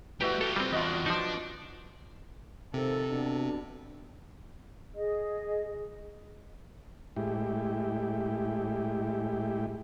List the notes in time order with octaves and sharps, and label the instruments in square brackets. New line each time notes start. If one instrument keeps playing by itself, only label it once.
[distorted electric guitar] G3 A3 [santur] E4 F#4 B4 [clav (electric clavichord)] G4 G5
[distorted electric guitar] F4 G4 [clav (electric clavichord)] A4
[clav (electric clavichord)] G3 C4
[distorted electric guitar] E2 D4 [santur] F4 F#4 D#5
[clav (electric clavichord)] F3 D#4 [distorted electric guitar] D4
[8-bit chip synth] C3 [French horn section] D#3 F3 [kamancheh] A4
[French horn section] B2 D4
[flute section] G#4 D#5
[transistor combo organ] A2 G#3 E4 G4